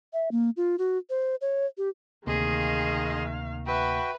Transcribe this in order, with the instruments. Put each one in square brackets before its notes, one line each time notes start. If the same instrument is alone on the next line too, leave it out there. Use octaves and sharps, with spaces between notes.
[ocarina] E5
A#3
F4
F#4
C5
C#5
G4
[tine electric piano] D2 C3 A#3 [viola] D#3 F5 [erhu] G#4 [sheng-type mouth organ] D#5 C6
[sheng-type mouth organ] F#4 G5 B5 [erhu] B4 [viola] E5